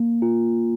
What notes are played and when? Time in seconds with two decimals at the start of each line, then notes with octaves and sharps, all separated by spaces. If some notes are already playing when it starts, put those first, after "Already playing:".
Already playing: A#3
0.22 F4